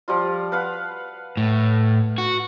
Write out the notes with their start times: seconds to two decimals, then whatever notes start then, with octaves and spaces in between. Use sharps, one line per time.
0.08 F3 G3 F4
0.52 B4 F5 F#5
1.37 A2
2.18 F#4